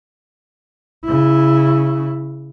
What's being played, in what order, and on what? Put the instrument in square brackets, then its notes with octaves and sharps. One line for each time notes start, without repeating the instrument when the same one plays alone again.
[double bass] C#3 E4